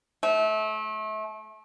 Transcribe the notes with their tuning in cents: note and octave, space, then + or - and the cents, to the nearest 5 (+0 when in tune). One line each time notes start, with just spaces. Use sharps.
A3 -30